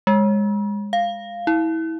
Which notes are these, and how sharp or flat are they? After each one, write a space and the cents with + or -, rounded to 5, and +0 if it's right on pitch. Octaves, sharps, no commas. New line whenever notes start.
G#3 -20
F5 -5
E4 -25